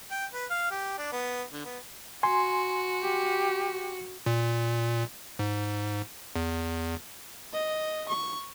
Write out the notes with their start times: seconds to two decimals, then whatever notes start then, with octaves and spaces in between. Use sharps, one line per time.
0.11 G5
0.33 B4
0.50 F5
0.71 G4
0.98 D4
1.12 B3
1.53 D3
1.65 B3
2.23 F#4 G#5 C6
3.02 G4
4.26 A#2
5.39 G#2
6.36 E2
7.53 D#5
8.08 C#6